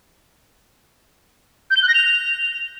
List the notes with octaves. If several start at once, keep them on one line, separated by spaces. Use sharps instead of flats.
G6
G7
F#6
A#6
F7